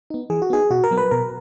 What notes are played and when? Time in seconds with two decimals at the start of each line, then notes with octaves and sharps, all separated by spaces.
0.10 B3 D#4
0.30 E3 G#4
0.42 F#4
0.50 B3 D#4 G#4
0.70 B2 F#4
0.84 A#4
0.91 F#3 B3
0.98 B4
1.11 B2 A#4